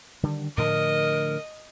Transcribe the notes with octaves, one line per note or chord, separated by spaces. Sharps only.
D3 D#3 G3
A2 D3 F3 A#4 D#5